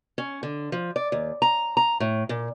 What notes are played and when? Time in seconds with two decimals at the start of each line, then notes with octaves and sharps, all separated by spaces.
0.18 C#4
0.43 D3
0.72 F3
0.96 D5
1.12 D#2
1.42 A#5
1.77 A#5
2.00 A2
2.29 A#2